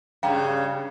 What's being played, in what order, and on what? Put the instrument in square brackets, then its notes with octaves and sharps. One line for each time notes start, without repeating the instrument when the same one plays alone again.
[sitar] G2 C#3 [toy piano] F5 G5 A#5